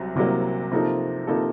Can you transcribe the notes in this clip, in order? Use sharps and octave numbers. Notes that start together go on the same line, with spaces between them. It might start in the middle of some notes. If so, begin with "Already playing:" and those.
Already playing: C2 C3 F#3
C2 C3 F#3 A#3
C3 F3 A#3 D#4 A4
C3 F3 A#3 D#4 A4